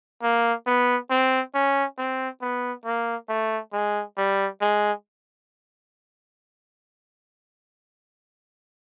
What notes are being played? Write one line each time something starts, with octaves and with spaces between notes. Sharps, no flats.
A#3
B3
C4
C#4
C4
B3
A#3
A3
G#3
G3
G#3